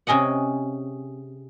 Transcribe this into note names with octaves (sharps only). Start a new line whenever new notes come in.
C3 C#4 G#4 D#5 F#5